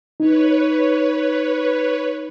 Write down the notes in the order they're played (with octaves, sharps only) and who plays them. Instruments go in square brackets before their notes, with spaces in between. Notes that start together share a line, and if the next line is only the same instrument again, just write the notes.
[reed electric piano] D#4 [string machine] B4 C#5